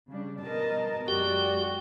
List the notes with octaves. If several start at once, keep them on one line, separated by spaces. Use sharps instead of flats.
C#3 G3 D4
B2 A#4 D#5 A5
F#2 G#3 F#4 G4 D5 G5